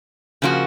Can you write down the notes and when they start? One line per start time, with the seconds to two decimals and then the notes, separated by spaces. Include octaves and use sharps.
0.42 C#3 F3 A#3 D4 F#4